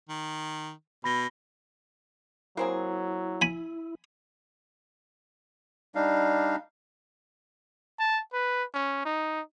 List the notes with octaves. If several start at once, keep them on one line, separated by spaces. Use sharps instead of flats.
D#3
B2 B5 A#6 G7
F#3 A#3 C4 E4 G#4
G#5 B5
G3 D4 D#4 F5
A5
B4
C#4
D#4